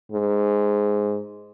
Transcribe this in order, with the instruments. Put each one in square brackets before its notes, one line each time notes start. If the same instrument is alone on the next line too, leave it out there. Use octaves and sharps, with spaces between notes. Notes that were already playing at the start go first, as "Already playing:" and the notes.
[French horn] G#2